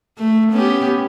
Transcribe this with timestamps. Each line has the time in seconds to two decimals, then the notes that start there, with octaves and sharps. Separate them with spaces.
0.18 A3
0.51 B3 C#4 G4